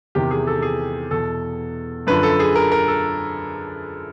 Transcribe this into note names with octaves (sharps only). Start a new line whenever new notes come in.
E2 C3 D#3 G4
G#4
A4
G#4
E2 B2 A4
F#2 D3 F3 B4
A4
G#4
A#4
A#4
A4